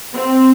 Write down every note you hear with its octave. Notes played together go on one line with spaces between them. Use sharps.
C4